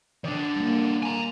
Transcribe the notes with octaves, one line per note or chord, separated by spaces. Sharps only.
D#3 D4 D5
G3 A#3
G#5 A#5